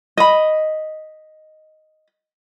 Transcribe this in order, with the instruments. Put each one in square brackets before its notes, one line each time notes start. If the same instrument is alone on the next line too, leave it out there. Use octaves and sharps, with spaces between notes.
[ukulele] D#5 B5